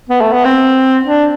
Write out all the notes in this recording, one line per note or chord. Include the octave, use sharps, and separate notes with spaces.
B3
A3
B3
C4
D4